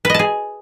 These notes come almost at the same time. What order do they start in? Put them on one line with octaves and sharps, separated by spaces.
B4 D#5 A5 G#4